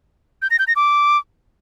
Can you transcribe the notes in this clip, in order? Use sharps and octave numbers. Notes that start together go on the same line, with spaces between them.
G6
A#6
G6
A#6
D6